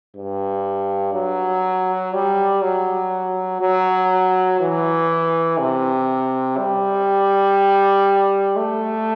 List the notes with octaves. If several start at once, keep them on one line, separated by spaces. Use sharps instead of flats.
G2
F#3
G3
F#3
F#3
E3
C3
G3
A3